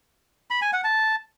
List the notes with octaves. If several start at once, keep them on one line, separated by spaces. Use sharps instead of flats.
B5
G#5
F#5
A5